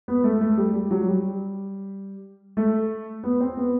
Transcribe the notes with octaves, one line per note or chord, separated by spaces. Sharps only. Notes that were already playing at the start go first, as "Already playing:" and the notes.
B3
A3
A3
G3
G3
F#3
G3
A3
B3
C4
B3